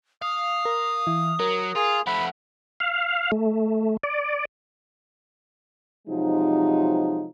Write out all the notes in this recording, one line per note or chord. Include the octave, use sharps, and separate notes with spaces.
F5 D#6
A#4
E3
F#3 A#4
F4 G#4
F3 A3 F#5 B5
F5
A3
D5
C3 F3 F#3 G#3 D#4